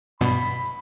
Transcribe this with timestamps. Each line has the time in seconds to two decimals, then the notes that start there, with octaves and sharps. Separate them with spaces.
0.21 G2 B2 B5